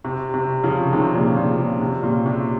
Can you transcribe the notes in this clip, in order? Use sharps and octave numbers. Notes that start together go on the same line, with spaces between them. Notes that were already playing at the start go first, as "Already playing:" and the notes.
C3
C3
C#3 F3
C3 D#3
A#2 C#3
A#2 C#3
A#2
C3
A#2 C#3
C3